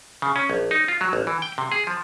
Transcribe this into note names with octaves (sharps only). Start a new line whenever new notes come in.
C#3
C#4
A#1
D#4
F4
F#3
A1
E3
G5
C3
G#4
F3